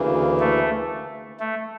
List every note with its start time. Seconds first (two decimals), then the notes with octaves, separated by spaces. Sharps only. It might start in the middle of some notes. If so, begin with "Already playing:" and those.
Already playing: D2 C#3 E3 A#3
0.40 A3
1.40 A3